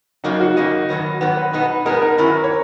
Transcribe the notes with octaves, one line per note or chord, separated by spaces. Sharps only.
F#2 C#3 F#3 A#3 D#4
F#4
F#2 C#3 F#3 A#3 D#5
G#2 D#3 F#3 B3
G#2 D#3 F#3 B3
B4
B2 G#3 B3 D#4
B2 G#3 B3 D#4 A#4
A#4
F#2 D#3 F#3 C#4 E4
C#5